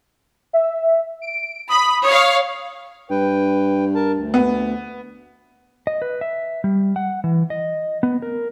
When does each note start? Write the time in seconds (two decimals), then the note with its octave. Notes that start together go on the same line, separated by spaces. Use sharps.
0.53 E5
1.22 D7
1.69 B5 D#6
2.04 C#5 F5
3.10 G2 B4 G5
3.95 A#4 A5
4.15 D2
4.34 B3
5.87 D#5
6.02 B4
6.21 E5
6.64 G3
6.96 F#5
7.24 E3
7.50 D#5
8.03 B3
8.22 A#4